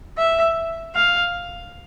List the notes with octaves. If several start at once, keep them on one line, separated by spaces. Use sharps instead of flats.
E5
F5